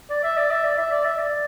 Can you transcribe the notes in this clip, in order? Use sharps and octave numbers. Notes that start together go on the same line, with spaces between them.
D5
E5
D5
E5
D5
E5
D5
E5
D5